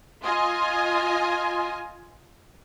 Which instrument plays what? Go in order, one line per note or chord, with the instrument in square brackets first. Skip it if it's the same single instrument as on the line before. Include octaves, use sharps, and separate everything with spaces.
[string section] F4 D#5 G#5